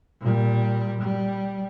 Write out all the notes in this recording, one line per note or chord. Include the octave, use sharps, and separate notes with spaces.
A#2 G3
G3